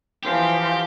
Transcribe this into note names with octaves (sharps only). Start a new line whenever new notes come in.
E3 F3 G4